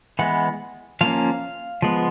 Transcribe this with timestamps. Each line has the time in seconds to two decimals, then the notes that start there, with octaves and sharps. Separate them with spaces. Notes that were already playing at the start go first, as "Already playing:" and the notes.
0.19 E3 G#3 B3 F#5
1.01 F3 A#3 C#4 F5
1.82 F3 G#3 B3